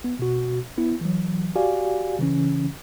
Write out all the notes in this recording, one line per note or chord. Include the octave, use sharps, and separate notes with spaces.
B3
B2 F#4
B3 E4
E3 F#3
F#4 G4 D5 F5 G#5
C#3 E3 C#4